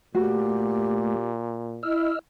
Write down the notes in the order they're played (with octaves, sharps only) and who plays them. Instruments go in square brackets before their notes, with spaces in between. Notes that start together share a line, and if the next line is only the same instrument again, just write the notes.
[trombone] A#2 [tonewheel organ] A3 [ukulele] F#4 [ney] G4
[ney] E4 [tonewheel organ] D#5 E6 F6